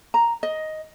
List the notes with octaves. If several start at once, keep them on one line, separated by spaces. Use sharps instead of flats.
A#5
D#5